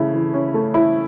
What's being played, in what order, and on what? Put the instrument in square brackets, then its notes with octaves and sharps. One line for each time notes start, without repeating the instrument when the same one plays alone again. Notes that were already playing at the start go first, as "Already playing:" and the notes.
Already playing: [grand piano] C#3 [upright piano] A3 E4
[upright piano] E3
C#4
A3
E4